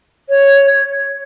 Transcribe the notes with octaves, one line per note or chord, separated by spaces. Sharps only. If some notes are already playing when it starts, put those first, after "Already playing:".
C#5